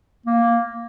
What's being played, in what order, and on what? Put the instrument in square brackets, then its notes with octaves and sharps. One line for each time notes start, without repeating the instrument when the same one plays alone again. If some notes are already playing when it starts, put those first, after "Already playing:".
[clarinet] A#3